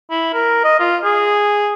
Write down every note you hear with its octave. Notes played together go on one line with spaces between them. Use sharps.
E4
A#4
D#5
F4
G#4